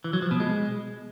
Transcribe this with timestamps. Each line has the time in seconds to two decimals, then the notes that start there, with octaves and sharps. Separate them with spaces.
0.04 E3
0.13 F#3
0.22 F3
0.31 B2
0.40 G#3